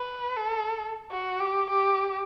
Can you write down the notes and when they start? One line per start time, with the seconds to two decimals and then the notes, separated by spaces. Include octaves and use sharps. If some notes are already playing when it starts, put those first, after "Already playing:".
Already playing: B4
0.37 A4
1.11 F#4
1.41 G4
1.70 G4